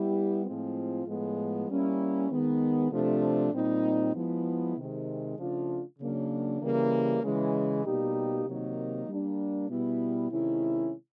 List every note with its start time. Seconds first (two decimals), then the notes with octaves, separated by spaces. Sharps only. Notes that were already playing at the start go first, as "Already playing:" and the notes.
Already playing: G3 B3 E4 G4
0.44 A2 F3 G#3 C4 F4
1.06 A2 F3 G#3 B3
1.68 G3 A#3 C#4 E4
2.29 D#3 G#3 B3
2.92 C3 F3 A3 D4
3.53 A#2 G3 C4 D#4
4.14 F3 G#3 B3 E4
4.76 C3 D#3 G#3
5.38 C#3 F3 A3 D4 F4
5.99 C#3 F#3 A#3 D4
6.61 C#3 E3 G3 A#3
7.22 C#3 E3 G#3
7.85 B2 G3 A#3 D#4 G4
8.46 C3 D#3 F#3 A#3 D#4
9.08 G3 A#3 D4
9.69 B2 G3 B3 E4
10.30 C3 D#3 G#3 C#4 E4